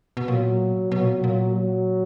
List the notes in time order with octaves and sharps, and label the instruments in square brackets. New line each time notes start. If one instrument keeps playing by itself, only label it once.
[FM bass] B2
[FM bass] A#2 [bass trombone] F#3
[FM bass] B2 [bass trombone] F#3
[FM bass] A#2
B2
[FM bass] A#2 [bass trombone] F#3
[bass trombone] F#3